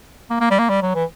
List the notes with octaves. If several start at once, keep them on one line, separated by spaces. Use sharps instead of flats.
A#3
A#3
G3
A#3
G3
F#3
E3